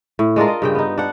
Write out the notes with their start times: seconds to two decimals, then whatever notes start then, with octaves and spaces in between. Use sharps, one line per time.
0.19 A2
0.36 G#3 D4 F4 A#4
0.48 D#5
0.62 G2 C#3 G5
0.75 B3 D#4
0.98 D4 F#5